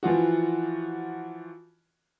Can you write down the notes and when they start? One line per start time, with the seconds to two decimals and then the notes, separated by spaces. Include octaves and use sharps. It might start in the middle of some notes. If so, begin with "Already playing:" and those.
0.03 E3 F3 F4 F#4